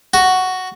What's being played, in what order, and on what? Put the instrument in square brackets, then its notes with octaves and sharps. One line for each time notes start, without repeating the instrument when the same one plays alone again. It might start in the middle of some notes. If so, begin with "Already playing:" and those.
[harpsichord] F#4